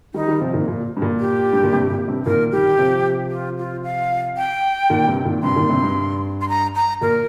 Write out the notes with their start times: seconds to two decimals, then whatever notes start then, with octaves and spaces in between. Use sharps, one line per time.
0.14 D#3 G3 D#4
0.28 D#3 G3
0.41 C3 F3
0.54 A#2 D#3
0.67 A#2
0.97 G2
1.02 A#2
1.20 G4
1.53 G2
1.63 A#2
1.73 G2 C3
1.90 A#2
2.08 G2 C3
2.26 A#2 D#3 A#4
2.52 D#3 G3 G4
2.78 C3 F3
3.31 F4
3.58 F4
3.84 F5
4.37 G5
4.90 A#2 D#3
5.07 G2 C3
5.25 A#2 D#3
5.43 G2 C3 C6
5.56 A#2 D#3
5.69 G2 C3
5.83 G2
6.41 C6
6.49 A#5
6.75 A#5
7.01 A#2 A#4